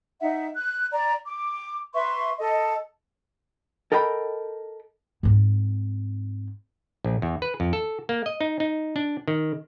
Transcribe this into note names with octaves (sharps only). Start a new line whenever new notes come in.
D#4 E5 F#5
F#6
D5 A#5
D6
B4 E5 C6 C#6
A4 D#5
A4 A#4 D#5 G5 G#5 B5
G#2 C4
A#1
E2
B4
F2
A4
A#3
D#5
D#4
D#4
D4
D#3